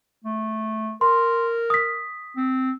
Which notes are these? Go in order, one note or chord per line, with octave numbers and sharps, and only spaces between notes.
A3
A#4 C6
D#6 B6
C4